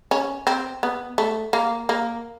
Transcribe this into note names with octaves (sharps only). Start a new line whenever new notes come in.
C#4
C4
B3
A3
A#3
A#3